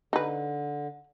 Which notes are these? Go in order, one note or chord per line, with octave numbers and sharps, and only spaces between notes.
D3 D#4 B4